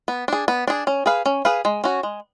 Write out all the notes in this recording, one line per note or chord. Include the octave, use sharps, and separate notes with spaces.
B3
D4 G#4
B3
D4 G#4
C#4
G#4 B4 F5
C#4
G#4 B4 F5
G#3
C#4 F#4
G#3